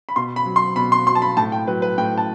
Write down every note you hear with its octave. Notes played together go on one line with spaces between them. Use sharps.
B5
B2 C6
B5
F#3
C6
B2 B5
C6
F#3 C6
A5
B5
A2 A5
G5
F#3 B4
B4
A2 G5
A5